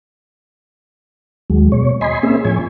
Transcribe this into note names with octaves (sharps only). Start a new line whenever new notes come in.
D#2 F#3 G#3
B2 C#5
D#5 G#5 B5 C6
A#3 C4 C#4 G#4 E5
A2 F3 C#5 G#5